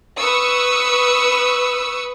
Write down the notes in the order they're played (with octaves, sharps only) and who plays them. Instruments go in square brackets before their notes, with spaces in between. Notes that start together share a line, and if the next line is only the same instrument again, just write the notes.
[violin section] B4 C#6 D#6 E6